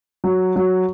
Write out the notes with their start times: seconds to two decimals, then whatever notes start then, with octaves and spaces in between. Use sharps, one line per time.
0.24 F#3
0.56 F#3